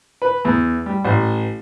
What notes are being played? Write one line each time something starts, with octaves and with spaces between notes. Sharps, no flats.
B4
E2
G3
A1